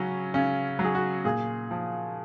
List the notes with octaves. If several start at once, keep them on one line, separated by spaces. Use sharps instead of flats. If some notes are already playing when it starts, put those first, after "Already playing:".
Already playing: C#3 F#3 C#4
C#3 C#4
F#3
G#4
F#4
A#2 G#4
F3